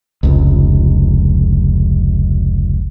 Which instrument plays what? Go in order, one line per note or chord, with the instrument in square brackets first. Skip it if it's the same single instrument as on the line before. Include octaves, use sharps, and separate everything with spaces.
[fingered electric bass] F1 C#2